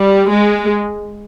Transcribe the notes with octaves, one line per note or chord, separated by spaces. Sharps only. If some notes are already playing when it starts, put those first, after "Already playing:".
Already playing: G3
G#3